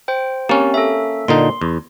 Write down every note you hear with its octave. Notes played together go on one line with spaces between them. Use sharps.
C5 G5
A#3 C4 C#4 G4
A4 E5
A#2 D3 D#4 C6
E2